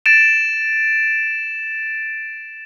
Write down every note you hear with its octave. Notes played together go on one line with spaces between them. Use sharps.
A6 D7 E7